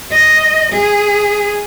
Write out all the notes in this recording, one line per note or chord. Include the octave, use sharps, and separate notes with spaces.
D#5
G#4